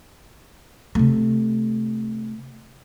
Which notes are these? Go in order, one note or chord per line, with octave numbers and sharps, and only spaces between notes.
C3 A3